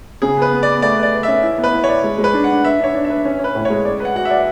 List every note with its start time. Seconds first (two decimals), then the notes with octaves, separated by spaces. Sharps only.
0.22 C#3 G#4
0.37 B3 B4
0.52 B3
0.63 B3 D5
0.82 A3 D5
0.98 B4
1.03 D5
1.13 B4
1.23 C#4 E5
1.43 E4
1.58 B3
1.64 B4
1.73 E4
1.84 C#5 D5
2.04 G#3
2.18 G#3
2.24 B4
2.34 D4
2.44 D4 F#5
2.64 B4 E5
2.80 D4 C#5
2.95 D4
3.05 E5
3.10 B4
3.25 C#4
3.39 C#4
3.44 B4
3.55 A2
3.65 C#5
3.70 G#3
3.85 D5
4.00 B4 F#5
4.15 F#4 F#5
4.25 E5
4.31 D5